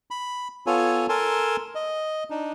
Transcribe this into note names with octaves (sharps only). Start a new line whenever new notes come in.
B5
B3 F4 A4 C#5 G#5
A4 A#4 G#5 A5 C6
D#5
D4 D#4